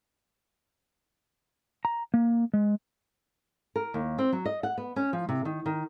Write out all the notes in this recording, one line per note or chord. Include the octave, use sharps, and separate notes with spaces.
A#5
A#3
G#3
A#4
D#2
C4
F#3
D#5
F#5
B3
C#4
F3
C3
D#3
D#3